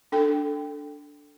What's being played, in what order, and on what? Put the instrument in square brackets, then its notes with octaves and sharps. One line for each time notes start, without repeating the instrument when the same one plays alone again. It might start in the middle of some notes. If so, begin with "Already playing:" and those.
[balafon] D4 A4 G5